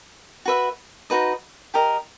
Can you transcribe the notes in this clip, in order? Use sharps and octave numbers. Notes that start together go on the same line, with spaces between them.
F#4 B4 E5
D#4 F#4 B4 D#5
G4 A#4 D#5